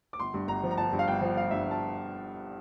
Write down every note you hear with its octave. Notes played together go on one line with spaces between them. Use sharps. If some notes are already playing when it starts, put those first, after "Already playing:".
D6
G1 C6
G2
G1 A#5
F3
A#5
G1 A5
G2
F5
G1 G5
F3
G1 F5
G2 E5
G1 A5